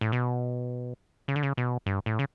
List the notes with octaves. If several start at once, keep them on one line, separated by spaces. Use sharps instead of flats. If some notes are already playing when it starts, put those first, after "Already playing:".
A2
B2
C#3
D3
C#3
B2
G2
A2
C#3